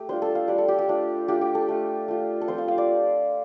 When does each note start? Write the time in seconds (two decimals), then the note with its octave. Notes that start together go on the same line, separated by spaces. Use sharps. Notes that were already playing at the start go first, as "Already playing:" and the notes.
Already playing: A3 G4
0.09 G3 D4 F4 C5
0.22 A4
0.35 F5
0.48 G3 D4 F4 D5
0.58 A4
0.68 G4
0.79 G4
0.88 A3 D4 F4
1.28 A3 D4 F4 G4
1.41 G4
1.55 A4
1.68 A3 F4
2.08 A3 F4
2.41 A4
2.48 F3 C4 F4 C5
2.58 F5
2.68 F5
2.78 D5